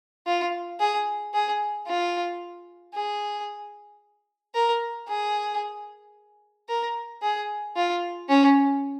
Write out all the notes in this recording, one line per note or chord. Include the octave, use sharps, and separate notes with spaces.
F4
G#4
G#4
F4
G#4
A#4
G#4
A#4
G#4
F4
C#4